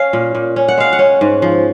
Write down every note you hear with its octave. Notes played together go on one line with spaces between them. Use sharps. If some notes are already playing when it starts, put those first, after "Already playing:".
Already playing: C#4 F5
A#2
A#2
C#4
F#5
G#3 F5
F#5
C#4
G#2
F3